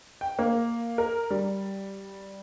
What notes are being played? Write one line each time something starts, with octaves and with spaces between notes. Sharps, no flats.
G5
A#3
A#4
G3